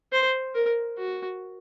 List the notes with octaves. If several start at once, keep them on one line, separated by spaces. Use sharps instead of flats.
C5
A#4
F#4